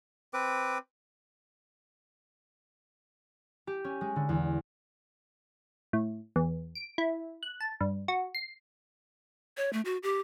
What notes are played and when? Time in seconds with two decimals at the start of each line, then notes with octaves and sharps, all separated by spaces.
0.33 C4 B4 D6
3.67 G4
3.84 C#4
4.01 G#3
4.16 D3
4.29 E2
5.93 A2
6.36 E2
6.75 D7
6.98 E4
7.43 F#6
7.60 A5
7.81 G2
8.08 F#4
8.35 C7
9.57 C#5
9.73 A3
9.85 F#4
10.03 G4